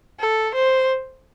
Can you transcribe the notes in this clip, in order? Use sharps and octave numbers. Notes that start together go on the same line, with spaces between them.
A4
C5